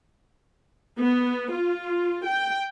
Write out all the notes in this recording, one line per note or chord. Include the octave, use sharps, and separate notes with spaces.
B3
F4
G5